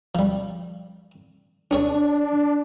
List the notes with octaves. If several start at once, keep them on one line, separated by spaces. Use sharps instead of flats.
F3 G3
C#4 D4 G#4 C#5